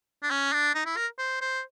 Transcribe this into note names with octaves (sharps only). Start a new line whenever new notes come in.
D4
C#4
D4
D#4
E4
A#4
C5
C5